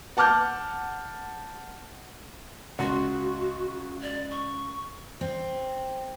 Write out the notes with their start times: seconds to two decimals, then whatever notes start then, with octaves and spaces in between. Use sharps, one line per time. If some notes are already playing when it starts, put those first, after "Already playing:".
0.17 F#5 A5 D6 F6 G6
2.79 C#2 F#4 F#5 C6
4.02 D5
4.31 C#6
5.21 C4